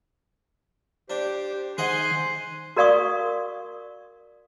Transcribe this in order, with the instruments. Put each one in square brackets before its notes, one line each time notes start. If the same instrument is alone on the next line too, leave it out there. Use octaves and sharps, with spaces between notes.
[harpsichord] D4 [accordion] G4 C5
[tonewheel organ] D#3 [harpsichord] G#4 D#5 F#5 [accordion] C5 G#5 F#6 [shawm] C6
[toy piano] F#4 A#4 D5 F5 C#6 D#6